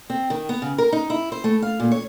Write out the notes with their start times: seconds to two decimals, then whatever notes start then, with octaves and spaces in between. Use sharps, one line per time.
0.10 C4
0.30 D#3
0.49 B3
0.62 C#3
0.78 A#4
0.93 D#4
1.10 E4
1.32 C5
1.44 A3
1.62 F5
1.80 A#2
1.91 C#5